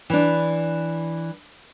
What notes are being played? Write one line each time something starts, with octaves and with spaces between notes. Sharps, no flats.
E3 D4